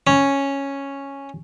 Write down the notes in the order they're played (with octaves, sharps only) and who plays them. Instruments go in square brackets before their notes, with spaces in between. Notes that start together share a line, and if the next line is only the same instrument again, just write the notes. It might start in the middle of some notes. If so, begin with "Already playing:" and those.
[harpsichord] C#4